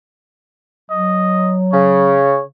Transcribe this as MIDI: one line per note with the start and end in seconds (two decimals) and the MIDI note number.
0.90 2.21 54
0.90 1.56 75
1.73 2.40 49
1.73 2.43 73